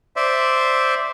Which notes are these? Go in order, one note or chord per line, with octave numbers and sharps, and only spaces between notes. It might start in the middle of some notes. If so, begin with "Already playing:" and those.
C5 D5 E5